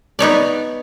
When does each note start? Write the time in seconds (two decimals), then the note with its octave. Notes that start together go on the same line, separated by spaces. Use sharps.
0.19 B3 D#4 C#5 D5